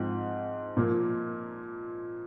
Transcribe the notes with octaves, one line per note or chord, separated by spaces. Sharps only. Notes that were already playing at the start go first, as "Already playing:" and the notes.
Already playing: G#2 F3 C4
A#2 F3 A#3